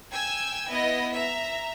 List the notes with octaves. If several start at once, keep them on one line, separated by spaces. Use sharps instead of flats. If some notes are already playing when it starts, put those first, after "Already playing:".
G5 G#5 E6 G#6
B3 E4 D#5
E5 A#5